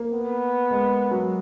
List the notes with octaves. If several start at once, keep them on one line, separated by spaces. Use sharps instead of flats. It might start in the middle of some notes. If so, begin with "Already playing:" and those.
Already playing: A#3
B3
G#3
F#3